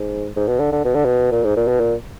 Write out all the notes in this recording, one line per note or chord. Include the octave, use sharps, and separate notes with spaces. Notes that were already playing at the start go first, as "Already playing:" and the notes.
Already playing: G#2
G#2
B2
D3
D3
B2
D3
B2
A#2
G#2
A#2
B2
A#2